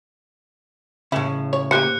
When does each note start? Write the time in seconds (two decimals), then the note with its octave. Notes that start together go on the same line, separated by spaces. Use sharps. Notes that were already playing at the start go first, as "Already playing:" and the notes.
1.12 A2 C#3 E4
1.53 C#5
1.71 A#3 G4 C5 F#6 C#7